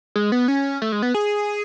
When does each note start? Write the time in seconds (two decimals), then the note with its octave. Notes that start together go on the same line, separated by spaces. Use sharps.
0.16 G#3
0.32 B3
0.48 C#4
0.82 A3
0.92 G#3
1.02 B3
1.14 G#4